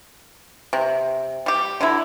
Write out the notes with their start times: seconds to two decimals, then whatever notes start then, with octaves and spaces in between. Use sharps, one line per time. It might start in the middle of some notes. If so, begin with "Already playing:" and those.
0.73 C3
1.46 G3 G4
1.81 D3 F#3 E4